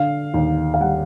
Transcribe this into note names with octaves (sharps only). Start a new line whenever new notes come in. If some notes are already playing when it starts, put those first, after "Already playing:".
Already playing: D3 F5
D#2
F5
G3 F#5